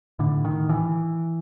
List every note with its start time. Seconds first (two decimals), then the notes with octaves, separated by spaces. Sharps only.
0.19 A2 D3
0.45 D#3
0.69 E3